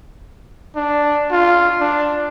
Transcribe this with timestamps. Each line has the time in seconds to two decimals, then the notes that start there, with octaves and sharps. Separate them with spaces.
0.76 D4
1.31 F4
1.80 D4